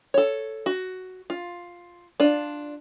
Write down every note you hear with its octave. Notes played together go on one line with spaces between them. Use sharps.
A4 C#5
F#4
F4
D4 F4 D5